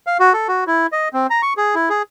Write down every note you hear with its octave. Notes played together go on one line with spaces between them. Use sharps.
F5
F#4
A4
F#4
E4
D#5
C4
A#5
C#6
G#4
E4
G#4